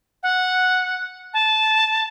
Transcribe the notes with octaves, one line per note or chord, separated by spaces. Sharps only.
F#5
A5